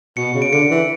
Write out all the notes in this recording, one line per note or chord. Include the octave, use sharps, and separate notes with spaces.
B2 C#7
C#3
D7
D3 C#7
E3